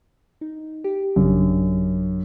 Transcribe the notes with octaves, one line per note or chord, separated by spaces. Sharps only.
D#4
G4
A1 F#2 C#3 D4